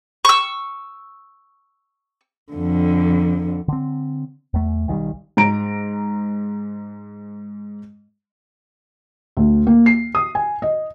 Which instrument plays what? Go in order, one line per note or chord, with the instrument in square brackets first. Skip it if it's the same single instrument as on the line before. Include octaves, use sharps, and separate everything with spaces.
[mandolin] C#6 E6
[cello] F2 D3
[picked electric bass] D3 C4
E2 A3
B1 D#3 E3 G3
[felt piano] G#2 A#5 D7
D2
A#3
C7
D#6
G#5
D#5